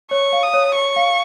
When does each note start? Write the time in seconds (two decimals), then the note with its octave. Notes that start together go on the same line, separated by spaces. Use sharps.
0.11 C#5 C#6
0.33 F5
0.43 D#6
0.54 C#5
0.75 C#5 C#6
0.96 F5